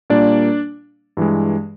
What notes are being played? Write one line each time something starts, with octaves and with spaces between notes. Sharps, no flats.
A#2 G3 A#3 D4 D5
G2 E3 G#3